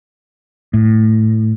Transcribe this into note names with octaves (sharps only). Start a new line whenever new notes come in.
A2